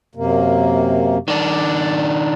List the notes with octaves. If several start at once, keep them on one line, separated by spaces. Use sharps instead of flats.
F#2 C3 A#3
D#3 D4 D5